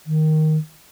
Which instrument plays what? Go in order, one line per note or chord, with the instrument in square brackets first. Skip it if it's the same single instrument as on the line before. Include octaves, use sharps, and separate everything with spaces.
[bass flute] D#3